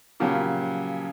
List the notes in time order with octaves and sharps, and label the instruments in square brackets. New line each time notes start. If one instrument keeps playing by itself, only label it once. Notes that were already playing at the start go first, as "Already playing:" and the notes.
[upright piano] A#2 C#3 F3 F#3 G4